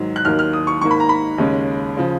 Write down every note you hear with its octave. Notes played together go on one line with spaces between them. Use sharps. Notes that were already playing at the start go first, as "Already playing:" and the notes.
Already playing: G#2 D#3 F#3
F#6
D#2 D#3 F#3 A#3 F6
F6
D#6
C#6
G#2 D#3 A#3 C#6
B5
A#5
B5
D#2 C#3 G#3 C#4
C#3 F3